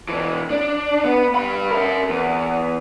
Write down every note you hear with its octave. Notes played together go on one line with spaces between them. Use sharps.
B2 E3
D4
B3
G2 B5
A#4 E5
E2